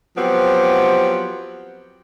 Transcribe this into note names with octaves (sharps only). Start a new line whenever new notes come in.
F3 F#3 B3 C4 G4 C5